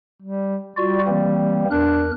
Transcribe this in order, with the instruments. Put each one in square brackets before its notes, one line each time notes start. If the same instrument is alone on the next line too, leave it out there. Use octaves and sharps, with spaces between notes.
[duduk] G3
[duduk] G3 [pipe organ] F4 F#4 D5
[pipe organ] E3 A#3 C4
[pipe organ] E2 A#4 F#6 [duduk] D4